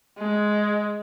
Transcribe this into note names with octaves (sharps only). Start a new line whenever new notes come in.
G#3